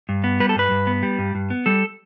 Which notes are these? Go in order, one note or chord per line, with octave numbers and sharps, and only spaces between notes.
G2
B3
G3 B4
A4
G2 B4
G2
B3
G3
G2
G2
B3
G3 A4